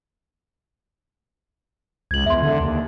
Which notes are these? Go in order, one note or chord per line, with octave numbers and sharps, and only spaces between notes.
C#2 G#6 F#7
E2 E5 C6
D3
D#2